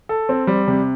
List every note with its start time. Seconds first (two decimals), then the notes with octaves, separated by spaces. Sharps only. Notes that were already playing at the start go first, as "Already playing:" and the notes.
0.09 A4
0.29 C4
0.47 G3
0.67 C3